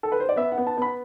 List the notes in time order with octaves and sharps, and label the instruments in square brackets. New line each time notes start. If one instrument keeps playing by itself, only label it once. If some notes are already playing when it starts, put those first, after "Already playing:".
[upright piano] A4
B4
C5
D5
B3 E5
F#5
B3
A5
B3 B5